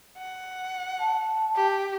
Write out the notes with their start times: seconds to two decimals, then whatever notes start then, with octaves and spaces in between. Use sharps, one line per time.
0.18 F#5
1.00 A5
1.56 G4